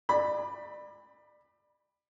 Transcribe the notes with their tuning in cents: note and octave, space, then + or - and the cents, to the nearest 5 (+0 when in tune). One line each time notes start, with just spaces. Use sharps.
D5 +30 B5 +0